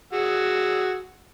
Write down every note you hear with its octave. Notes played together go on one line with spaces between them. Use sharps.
F#4 G#4 E6